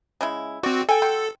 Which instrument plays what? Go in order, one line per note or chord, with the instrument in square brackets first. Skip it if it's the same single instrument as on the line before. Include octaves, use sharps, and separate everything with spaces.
[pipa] C#3 G#3 E4
[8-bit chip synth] C4 F#4 [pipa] D5
[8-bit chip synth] A4 [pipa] G5 G#5
[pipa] F#3 G5 C6